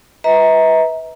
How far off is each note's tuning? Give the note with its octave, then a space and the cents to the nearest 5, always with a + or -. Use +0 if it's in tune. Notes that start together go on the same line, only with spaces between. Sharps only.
B4 +0 E5 -45 A#5 +0